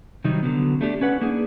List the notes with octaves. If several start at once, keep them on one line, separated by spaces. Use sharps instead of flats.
C3 D#3 F#3 G3 D#4 F#4
D3 F#3 B3
A3 D4 G4
C#4 B4 F#5
A#3 D4 D#4 G#4